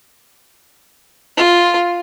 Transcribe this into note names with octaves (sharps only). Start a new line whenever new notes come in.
F4